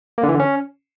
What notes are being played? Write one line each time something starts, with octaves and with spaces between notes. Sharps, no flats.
A#3
D3
E3
D3
C#4